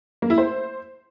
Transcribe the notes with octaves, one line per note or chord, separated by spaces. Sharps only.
A#3
E4
C5